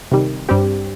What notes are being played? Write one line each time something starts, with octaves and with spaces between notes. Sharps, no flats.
C3 D#3 G3
G2 G3 C4 G4